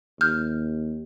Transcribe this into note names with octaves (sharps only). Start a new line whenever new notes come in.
D#2 F6 G6